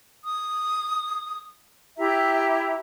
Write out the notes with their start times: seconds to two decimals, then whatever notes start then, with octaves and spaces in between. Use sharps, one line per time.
0.24 D#6
1.97 E4 G4 E5 A#5